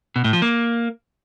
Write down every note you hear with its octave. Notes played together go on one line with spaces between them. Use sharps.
B2
A2
F3
A#3